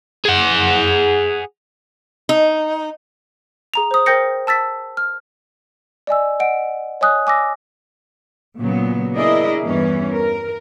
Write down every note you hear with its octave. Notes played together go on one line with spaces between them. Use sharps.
G#4 F#5
D#4
G#4 A#5 F7
C5 D#6
A#4 C5 G5 G6 A#6 C#7
A5 E6 A6 B6
F6
D5 D#5 G#5 E6
D#5 F#5 D7
C#5 D#5 G#5 D#6 F#6
G#5 D6 E6 A#6
A#2 C#3 F#3 B3
D4 E4 G#4 A#4 D5 D#5
E2 G2 E3 C#4
A#4